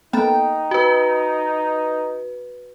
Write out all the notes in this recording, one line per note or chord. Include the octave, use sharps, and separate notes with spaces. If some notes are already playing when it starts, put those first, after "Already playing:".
A#3 B3 D#4 A4 G5
F#4 B4